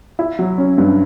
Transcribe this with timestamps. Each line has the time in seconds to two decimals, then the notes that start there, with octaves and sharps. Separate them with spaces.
0.19 E4
0.39 F#3
0.58 C#4
0.78 G2